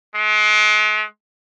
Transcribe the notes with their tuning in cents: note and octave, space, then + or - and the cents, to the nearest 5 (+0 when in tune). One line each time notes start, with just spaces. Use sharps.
G#3 +40